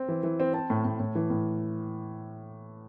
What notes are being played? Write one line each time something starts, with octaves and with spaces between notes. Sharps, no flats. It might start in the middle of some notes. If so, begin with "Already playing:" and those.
Already playing: C4
E3
E3
C4
C4 A5
A2
A2
A2
E3
A2